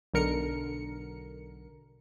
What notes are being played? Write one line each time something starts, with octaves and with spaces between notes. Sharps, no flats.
B1 D3 A#4 C#7